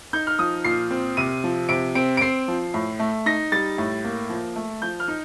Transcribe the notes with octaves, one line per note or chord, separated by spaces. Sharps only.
D#4 G6
F6
F3 D#6
A#2 C7
C4
C3 D#7
F3
C3 D7
C4 D7
D7
C4 C7
F3
A2
A3
D#4 A#6
G3 A6
A2
A#3
F3
A3
F3 G6
F6
D#4